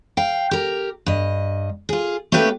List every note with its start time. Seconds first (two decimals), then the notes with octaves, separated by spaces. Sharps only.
0.17 F5 G5
0.51 G4 A#4
1.06 G2 D#5
1.89 F4 G#4
2.32 A3 A#3 C#4 G4 B4 G5